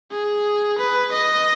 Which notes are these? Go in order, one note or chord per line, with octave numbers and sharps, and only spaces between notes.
G#4
B4
D#5